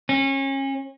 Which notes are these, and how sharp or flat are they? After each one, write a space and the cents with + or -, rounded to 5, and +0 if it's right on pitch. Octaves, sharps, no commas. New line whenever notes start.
C#4 -30